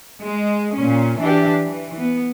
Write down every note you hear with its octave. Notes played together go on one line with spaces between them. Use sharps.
G#3
A#2 C#4
E3 D4 G4
E3
B3